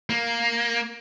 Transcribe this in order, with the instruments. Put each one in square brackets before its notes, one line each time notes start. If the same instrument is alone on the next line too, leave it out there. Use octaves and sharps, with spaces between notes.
[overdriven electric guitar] A#3